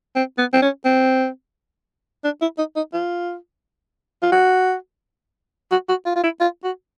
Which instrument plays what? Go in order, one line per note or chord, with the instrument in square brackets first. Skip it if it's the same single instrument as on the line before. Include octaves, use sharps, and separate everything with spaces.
[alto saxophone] C4
B3
C4
C#4
C4
D4
E4
D#4
D#4
F4
F4
F#4
F#4
F#4
F4
F4
E4
F4
F#4